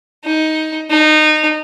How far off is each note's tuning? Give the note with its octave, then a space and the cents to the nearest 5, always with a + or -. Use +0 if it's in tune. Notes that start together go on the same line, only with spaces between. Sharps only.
D#4 +15
D#4 -20